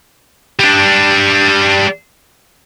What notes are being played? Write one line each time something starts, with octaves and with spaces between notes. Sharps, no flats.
G3 D4